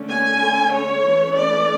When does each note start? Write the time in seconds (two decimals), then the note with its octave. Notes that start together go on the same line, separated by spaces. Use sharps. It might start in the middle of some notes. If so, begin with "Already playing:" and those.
Already playing: D3 A3 C#4
0.08 G#5
0.73 C#5
1.04 E3 A3 C#4
1.37 D5